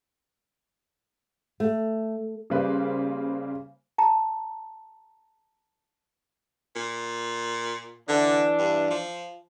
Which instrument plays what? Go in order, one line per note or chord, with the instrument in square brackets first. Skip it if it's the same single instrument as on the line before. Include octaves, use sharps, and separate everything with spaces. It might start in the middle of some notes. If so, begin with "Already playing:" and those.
[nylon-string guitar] A3
[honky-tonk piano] C#3 G3 A#3 B4 C5
[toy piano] A5 A#5
[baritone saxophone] A#2
[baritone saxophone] D3 [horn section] E3 D4
[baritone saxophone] G2
F3